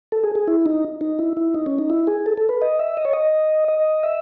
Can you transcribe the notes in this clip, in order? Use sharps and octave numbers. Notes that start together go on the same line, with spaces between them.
A4
G#4
G#4
E4
D#4
D#4
E4
E4
D#4
C#4
D#4
E4
G#4
A4
A4
B4
D#5
E5
D#5
C#5
D#5
D#5
E5